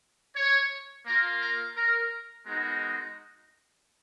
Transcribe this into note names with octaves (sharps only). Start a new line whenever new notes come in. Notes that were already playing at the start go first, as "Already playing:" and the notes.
C#5
A#3 F4 A#4
A#4
A#4
G#3 B3 D#4 F#4 A#4